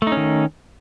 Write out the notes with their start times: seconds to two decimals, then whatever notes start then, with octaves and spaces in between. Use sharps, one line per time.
0.02 A3
0.07 D#4
0.12 C#4
0.17 D#3